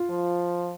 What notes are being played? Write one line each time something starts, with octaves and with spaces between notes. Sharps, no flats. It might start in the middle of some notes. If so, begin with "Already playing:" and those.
Already playing: F4
F3